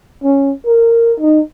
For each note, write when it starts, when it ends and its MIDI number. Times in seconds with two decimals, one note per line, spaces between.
0.24 0.52 61
0.66 1.13 70
1.20 1.40 63